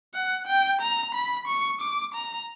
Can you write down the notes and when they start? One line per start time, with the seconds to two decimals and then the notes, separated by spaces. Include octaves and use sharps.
0.14 F#5
0.47 G5
0.81 A#5
1.14 B5
1.47 C#6
1.81 D6
2.14 A#5